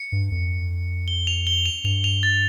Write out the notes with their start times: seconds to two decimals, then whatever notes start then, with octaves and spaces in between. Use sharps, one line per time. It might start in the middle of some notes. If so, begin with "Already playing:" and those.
Already playing: C#7
0.12 G2
0.31 F2
1.08 G7
1.27 F7
1.47 G7
1.66 F7
1.84 G2 F7
2.04 F7
2.23 A6